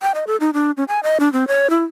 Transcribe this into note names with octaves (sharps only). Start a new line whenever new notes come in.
G5
D#5
A4
D#4
D4
C#4
G#5
D#5
D4
C4
C#5
E4